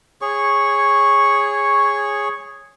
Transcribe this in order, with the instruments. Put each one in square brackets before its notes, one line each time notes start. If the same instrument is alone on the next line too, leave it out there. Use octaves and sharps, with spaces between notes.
[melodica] G#4 C#5 C#6